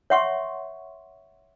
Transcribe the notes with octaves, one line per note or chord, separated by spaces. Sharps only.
C#5 E5 F#5 C6 C#6